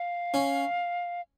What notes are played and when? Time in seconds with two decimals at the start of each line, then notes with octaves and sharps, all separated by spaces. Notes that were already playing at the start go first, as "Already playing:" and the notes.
Already playing: F5
0.34 C#4